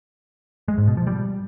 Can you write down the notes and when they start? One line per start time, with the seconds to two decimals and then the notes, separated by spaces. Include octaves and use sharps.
0.68 G#3
0.78 G#2
0.88 B2
0.97 F3
1.07 G3